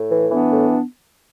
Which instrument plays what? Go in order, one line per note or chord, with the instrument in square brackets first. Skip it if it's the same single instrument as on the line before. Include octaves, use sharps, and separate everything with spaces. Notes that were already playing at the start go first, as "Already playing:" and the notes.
Already playing: [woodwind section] A2
E3
E3 B3 D4
A2